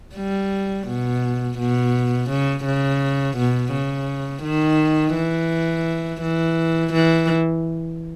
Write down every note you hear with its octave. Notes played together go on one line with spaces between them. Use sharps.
G3
B2
B2
C#3
C#3
B2
C#3
D#3
E3
E3
E3